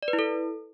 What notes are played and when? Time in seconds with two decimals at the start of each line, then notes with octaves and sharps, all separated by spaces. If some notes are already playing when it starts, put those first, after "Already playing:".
0.02 D5
0.08 B4
0.13 E4
0.19 A4